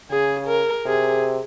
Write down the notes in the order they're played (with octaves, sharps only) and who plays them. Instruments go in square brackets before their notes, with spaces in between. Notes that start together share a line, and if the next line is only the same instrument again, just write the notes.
[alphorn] C#3 [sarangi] G#4
[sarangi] A#4
[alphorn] C3 [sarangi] G#4